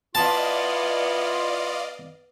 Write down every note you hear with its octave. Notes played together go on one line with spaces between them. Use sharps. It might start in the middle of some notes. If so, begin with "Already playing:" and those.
B3 E4 F4 D5 D#5 F5 A5